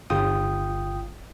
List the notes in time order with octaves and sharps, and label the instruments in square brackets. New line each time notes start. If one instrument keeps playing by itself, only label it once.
[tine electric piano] G1 F4 G5 D#6